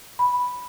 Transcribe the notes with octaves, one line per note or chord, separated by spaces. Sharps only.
B5